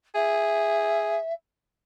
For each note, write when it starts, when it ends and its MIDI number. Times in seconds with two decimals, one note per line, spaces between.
0.15 1.17 68
0.15 1.33 76